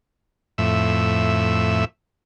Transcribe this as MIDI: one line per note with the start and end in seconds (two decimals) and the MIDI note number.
0.58 1.85 41
0.58 1.85 45
0.58 1.85 76